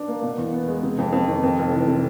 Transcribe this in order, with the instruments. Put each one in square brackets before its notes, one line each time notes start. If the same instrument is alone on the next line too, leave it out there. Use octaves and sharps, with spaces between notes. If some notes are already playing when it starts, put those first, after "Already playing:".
Already playing: [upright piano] D4
A#3
B2
E2
B3
G#3
C3
F2
F2
D#3
F2
F1
E3
C3